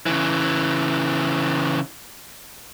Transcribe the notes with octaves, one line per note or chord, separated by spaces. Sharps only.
C#3 E3